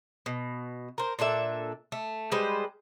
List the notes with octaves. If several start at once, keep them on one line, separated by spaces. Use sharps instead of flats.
B2
A#4 C5
A#2 D4 A4 E5
A3
G3 G#3 B4 C5